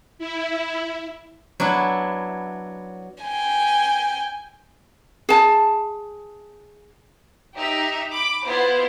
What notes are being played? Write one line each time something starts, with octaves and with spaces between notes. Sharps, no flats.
E4
F#3 B3 D4 E4
G5 G#5
G#4 A5
D#4 G4 E5
B5 D6
B3 E4 F4 C5